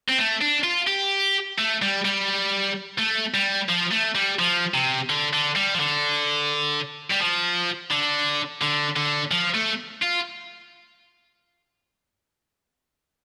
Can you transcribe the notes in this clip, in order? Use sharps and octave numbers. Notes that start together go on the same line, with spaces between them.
C4
A3
D4
F4
G4
A3
G3
G3
A3
G3
F3
A3
G3
F3
C3
D3
D3
G3
F3
D3
G3
F3
D3
D3
D3
F3
A3
F4